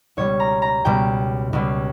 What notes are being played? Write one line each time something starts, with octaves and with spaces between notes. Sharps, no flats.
C#2 B2 G3 C#5
A#5
A#5
C#2 B2 G3 G5
C#2 B2 G3